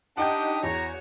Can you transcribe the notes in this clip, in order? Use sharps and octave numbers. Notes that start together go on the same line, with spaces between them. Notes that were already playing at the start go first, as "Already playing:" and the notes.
D4 D#4 G4 F#5 G5 D#6 G6
E2 F#4 C#5 A#5